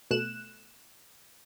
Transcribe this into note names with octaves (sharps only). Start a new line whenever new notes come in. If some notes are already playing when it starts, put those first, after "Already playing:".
B2 A3 F#6 E7